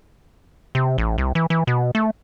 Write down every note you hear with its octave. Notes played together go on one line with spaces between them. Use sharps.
C3
A1
C2
E3
E3
B2
A3